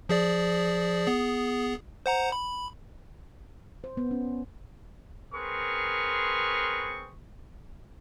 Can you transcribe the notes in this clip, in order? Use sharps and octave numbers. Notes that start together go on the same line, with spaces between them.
F3 G#4 D5
B3 G#4
C5 F#5 A#5
B5
C5
B3
C#4
C4 G#4 A#4 B4 C6 C#6